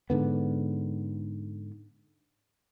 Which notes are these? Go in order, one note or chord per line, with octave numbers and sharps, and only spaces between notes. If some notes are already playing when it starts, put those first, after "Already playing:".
G#2 D3 B3